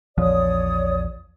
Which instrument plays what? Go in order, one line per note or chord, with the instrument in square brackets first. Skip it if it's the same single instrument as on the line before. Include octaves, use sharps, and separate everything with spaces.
[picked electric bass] A#1 E2 F3 [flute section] C#5 D5 D#6